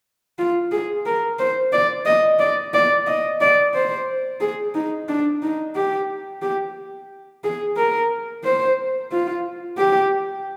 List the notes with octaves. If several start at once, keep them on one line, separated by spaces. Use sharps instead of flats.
F4
G#4
A#4
C5
D5
D#5
D5
D5
D#5
D5
C5
G#4
D#4
D4
D#4
G4
G4
G#4
A#4
C5
F4
G4